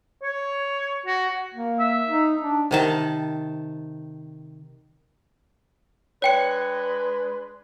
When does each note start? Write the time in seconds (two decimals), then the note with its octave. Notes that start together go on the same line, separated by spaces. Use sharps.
0.23 C#5
1.06 F#4
1.54 A#3
1.80 E5
2.07 D#4
2.41 D4
2.71 C3 D#3 A5
6.22 G#3 D4 B4 C#5 G5 C#7